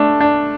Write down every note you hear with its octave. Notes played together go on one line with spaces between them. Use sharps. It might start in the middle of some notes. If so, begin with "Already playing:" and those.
Already playing: A3 D4
D4